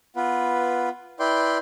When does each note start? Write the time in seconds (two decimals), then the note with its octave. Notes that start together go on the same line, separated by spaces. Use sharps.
0.16 B3 F4 B4
1.19 E4 B4 D5 G5 C6